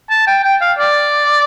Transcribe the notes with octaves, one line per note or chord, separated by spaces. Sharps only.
A5
G5
G5
F5
D5